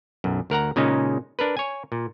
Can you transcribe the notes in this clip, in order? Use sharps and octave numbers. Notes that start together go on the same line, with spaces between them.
B1 F#2
D2 A#4 F#5 A#5
A#2 C#3 G#3 C#4 D#4
D4 A#4 B4
C#5 G#5
A#2